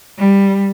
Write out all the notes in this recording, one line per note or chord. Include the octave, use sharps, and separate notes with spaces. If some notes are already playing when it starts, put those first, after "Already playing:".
G3